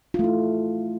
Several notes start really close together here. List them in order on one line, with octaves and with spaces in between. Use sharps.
F4 A3 E4